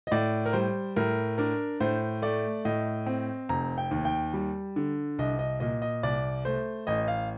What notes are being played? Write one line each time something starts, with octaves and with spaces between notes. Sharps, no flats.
D#5
A2 D5
A#4
G3 C5
A2 A#4
D4 A#4
A2 C5
A3 D5
A2 D#5
C4
F1 A#5
G5
D#2
G5
G3
D3
C2 D#5
D#5
A#2 D#5
D#5
C2 D5
A3 C5
A1 D#5
F5